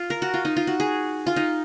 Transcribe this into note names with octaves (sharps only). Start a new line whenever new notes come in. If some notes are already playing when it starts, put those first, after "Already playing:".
Already playing: F4
A#4
F#4
F4
D#4
F4
F#4
G#4
F4
D#4